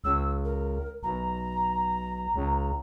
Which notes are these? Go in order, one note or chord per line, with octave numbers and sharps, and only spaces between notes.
C#2 E6
A#4
B1 A#5
C#2